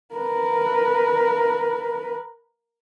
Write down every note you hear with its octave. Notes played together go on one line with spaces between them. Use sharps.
A#4 B4